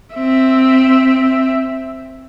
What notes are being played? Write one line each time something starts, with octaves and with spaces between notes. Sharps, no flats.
C4 E5